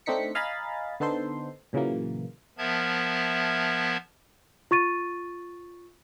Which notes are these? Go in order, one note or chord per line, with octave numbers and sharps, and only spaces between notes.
A3 C4 D4 D#4 B6 C#7
D#5 F5 G#5 A#5 B5 A6
D3 B3 D#4 A4 C5 C6
A#2 C#3 E3 F#3 A#3
F3 B3 A#4 E5 A5 G#6
F4 C#6 A6 D#7